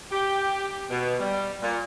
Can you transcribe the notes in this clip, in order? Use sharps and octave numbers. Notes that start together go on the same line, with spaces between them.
G4
B2
G3
A#2